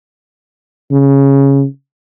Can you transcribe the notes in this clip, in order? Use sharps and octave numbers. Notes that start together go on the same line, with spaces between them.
C#3